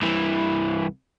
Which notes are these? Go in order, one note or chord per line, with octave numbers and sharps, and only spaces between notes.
C2 E3